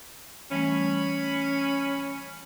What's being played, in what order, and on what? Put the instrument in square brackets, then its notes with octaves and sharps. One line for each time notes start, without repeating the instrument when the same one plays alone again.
[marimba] E3 G3 A3 [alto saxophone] C#4 [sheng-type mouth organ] B5